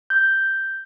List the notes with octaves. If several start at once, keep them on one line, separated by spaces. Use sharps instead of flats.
G6